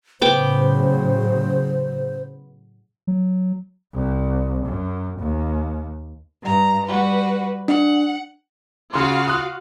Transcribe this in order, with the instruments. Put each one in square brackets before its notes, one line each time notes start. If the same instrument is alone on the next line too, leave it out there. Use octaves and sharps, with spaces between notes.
[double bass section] A2 C#3 F#3 [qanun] B3 G5 D6 [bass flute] C5
[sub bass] F#3
[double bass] C2
F#2
D#2
[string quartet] G2 A#5
G3 F#4 B4
[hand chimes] D4 [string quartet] F#5
[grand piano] C#3 C6 [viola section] F4 F#4 F5
[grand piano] D#6 F#6